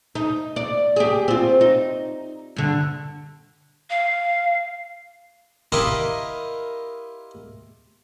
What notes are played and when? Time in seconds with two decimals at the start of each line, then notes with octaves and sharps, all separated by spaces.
0.15 D#4
0.56 D5
0.96 G4 G#4
1.28 C4 F4
1.61 D#4
2.56 G2 D3
3.90 F5
5.72 E4 F4 G4 A#4 D#5